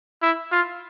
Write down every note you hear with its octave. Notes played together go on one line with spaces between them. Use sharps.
E4
F4